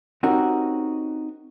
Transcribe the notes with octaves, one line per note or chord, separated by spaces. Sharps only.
C4 C#4 D#4 F#4 G4 A#4